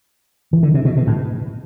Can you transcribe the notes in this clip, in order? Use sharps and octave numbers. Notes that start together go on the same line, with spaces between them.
E3
D3
C3
B2
B2
A2